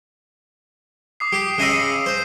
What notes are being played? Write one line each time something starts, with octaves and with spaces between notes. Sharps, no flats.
D6 D#6 C7
G4 D6
C#3 D#5 B5 E6 D#7 E7
C5